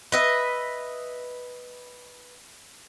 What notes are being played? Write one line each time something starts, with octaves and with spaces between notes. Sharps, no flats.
B4 D#5 E5